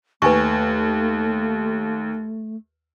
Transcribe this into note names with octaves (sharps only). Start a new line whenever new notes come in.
D#2 A3 B4 G#5 C#6